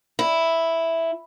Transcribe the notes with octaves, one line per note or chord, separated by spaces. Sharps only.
E4